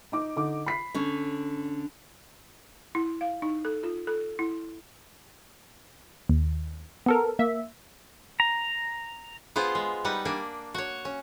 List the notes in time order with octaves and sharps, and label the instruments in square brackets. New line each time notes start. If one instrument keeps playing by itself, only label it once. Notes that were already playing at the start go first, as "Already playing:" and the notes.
[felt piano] D#4 D6
D3 D#4 D6
B5 B6 C7
[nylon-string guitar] D3 C#4
[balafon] E4
F5
D#4
A4
F4
A4
E4
[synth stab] D#2
B3 A4 A#4
A#3 E5
[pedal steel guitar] A#5
[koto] B3 F4 G#4 C5
G#3
G3 D#4 B4 F#5
A#3 D4 G#5
F#4 C#5
C#4